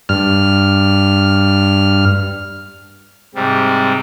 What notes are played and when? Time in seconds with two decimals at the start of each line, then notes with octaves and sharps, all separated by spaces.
0.09 G2 F6
3.35 G#2 C3 G3